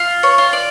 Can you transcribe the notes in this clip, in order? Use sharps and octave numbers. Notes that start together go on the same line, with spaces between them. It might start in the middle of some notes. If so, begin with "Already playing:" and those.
Already playing: F4
C#5
F4
D5